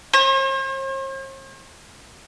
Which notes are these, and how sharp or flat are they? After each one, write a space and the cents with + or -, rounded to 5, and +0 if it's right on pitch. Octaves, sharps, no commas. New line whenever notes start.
C5 +45